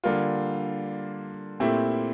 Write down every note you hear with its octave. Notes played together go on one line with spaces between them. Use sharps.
D3 G3 A#3 F4
A#2 A3 C4 E4 G4